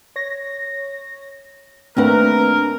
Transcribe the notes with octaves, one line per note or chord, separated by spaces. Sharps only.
C#5 A#6
D#2 A3 C4 D4 A#4 B4 F#5